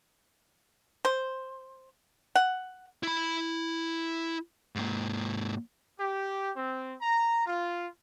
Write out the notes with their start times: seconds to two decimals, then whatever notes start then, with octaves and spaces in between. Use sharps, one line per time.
1.05 C5
2.35 F#5
3.03 E4 B5
4.76 G#2 A#3
5.99 G4
6.55 C4
7.01 A#5
7.46 F4